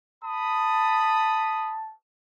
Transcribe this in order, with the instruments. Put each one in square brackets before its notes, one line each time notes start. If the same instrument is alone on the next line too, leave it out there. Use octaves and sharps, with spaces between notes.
[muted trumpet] A5 [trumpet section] B5 D#6